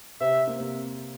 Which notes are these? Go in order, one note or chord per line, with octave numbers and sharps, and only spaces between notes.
C3 C4 E5
A#3
C3 C4